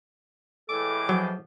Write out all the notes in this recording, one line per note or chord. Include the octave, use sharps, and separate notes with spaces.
A2 E3 G#3 A4 D6
F3 F#3